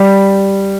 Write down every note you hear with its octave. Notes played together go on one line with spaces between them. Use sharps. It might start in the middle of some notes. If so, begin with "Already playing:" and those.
Already playing: G3